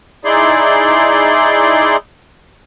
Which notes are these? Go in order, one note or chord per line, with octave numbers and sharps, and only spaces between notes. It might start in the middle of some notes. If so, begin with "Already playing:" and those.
D#4 E4 G#4 D5 C6